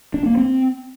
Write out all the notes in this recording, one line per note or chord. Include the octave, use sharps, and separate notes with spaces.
D4
A#3
C4